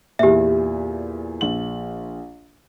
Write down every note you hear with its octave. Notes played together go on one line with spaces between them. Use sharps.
E2 A#2 G4 E5
A#1 F#7